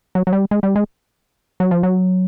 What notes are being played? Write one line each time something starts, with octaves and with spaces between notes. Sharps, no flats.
F#3
F#3
G3
G#3
G3
G#3
F#3
F3
F#3